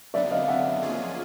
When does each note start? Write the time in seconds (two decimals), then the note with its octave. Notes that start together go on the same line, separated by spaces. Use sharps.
0.14 F#2 D3 F#3 B3 D4 D5 E5
0.31 D#5 F5
0.48 E5 F#5
0.83 F3 A#3 C#4 F4 G#4